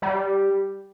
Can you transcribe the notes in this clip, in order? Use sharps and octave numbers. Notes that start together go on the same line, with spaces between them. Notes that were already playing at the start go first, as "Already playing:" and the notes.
G3